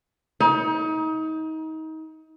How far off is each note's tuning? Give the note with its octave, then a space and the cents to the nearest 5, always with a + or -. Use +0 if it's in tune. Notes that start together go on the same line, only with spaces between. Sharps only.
D#4 +30